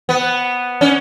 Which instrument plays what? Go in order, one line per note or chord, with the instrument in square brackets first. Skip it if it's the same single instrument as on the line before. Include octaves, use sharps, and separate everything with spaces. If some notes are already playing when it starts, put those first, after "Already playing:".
[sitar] B3
C#4